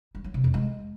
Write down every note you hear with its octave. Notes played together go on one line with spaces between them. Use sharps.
G3
F#3
C3
F2
G#3